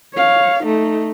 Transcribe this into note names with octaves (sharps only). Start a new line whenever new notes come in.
C#5 F5
A3 D#4